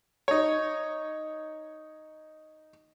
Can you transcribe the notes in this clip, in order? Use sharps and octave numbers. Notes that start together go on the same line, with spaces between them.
D#4 C#5